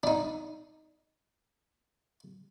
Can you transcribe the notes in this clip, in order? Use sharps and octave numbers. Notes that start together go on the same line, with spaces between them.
D4 D#4